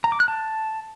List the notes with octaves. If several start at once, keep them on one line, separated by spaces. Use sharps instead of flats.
A#5
D6
F#6
A5